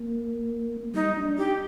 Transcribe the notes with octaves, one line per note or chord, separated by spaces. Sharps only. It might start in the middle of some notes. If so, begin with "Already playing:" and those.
Already playing: A#3
G3 D#4
D4
D#4 G4